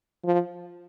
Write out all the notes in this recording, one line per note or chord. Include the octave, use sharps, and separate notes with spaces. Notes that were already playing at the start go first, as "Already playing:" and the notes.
F3